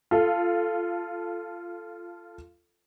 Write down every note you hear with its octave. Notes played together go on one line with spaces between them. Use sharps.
F4 A4